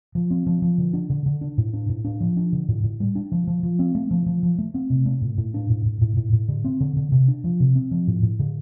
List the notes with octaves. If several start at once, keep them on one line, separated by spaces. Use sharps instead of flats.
F3
C4
F3
F3
D3
D4
D3
D3
D4
A2
D4
A2
D4
F3
D4
D3
A2
A2
G3
D4
F3
F3
F3
C4
A3
F3
F3
F3
A3
C4
C3
A3
A2
A2
D4
A2
A2
A2
A2
A2
D3
C4
D3
D3
C3
D4
F3
C3
C4
F3
A2
A2
D3